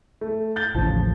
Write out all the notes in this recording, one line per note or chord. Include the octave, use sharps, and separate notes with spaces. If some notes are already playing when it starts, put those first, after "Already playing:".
A3
G6 A6 G7
A1 D#2 A2 C#3 F3 A5